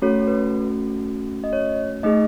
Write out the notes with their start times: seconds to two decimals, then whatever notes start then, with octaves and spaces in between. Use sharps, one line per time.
0.02 A3 C#4 F#4 A4 C#5
0.28 B4
1.44 D#5
1.53 C#5
2.03 A3 D#4 G#4 D#5